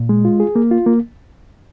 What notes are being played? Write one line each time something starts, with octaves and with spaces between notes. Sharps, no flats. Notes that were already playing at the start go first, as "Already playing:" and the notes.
Already playing: A#2
G#3
F4
G#4
A#3
F4
A#3